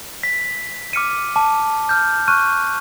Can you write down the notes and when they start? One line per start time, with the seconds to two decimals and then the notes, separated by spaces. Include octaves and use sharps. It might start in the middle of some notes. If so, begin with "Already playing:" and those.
0.23 B6
0.93 D6 F6 C#7 D#7
1.36 A5 D6
1.89 F6 G6
2.28 C#6 F6 F#6 D#7